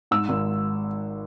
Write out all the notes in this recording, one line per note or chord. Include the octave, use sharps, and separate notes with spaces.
G#2 E6
G#1